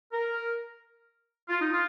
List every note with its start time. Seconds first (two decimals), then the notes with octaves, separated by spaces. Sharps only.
0.13 A#4
1.49 F4
1.61 D#4
1.73 F4